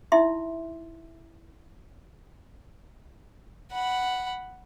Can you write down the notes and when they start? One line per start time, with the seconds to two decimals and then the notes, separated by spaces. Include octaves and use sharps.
0.12 D#4 E4 E5 C6
3.72 F#5 B5